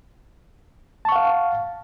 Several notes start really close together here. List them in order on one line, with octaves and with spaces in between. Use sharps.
A5 C#6 F#5 F5